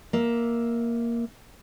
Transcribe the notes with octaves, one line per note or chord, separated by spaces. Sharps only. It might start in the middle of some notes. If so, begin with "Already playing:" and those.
A#3 E5